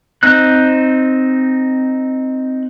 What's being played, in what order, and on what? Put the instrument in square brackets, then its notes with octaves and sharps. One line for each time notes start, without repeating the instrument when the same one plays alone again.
[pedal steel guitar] C4 D#4 F#6